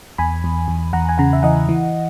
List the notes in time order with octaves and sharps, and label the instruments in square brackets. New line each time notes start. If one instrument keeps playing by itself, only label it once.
[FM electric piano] E2 G#5 B5
E2
E2
E2 F#5 A#5
G#5
C#3 F#5 A#5
E5
E3 D#5 F#5
E3